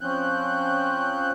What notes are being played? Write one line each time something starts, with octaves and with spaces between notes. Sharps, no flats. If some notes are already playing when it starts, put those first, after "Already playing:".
F3 C4 C#4 F#6 G6